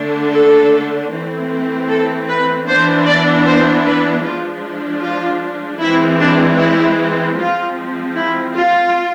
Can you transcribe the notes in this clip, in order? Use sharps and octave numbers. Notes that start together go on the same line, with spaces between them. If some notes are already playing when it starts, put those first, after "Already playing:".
Already playing: D3 A3 D4
A4
E3 A3 C4
A4
B4
E3 B3 D4 C5
D5
C5
B4
F3 G#3 D4 F4
F4
E3 G#3 C4 E4
D4
E4
F3 G#3 C4 F4
E4
F4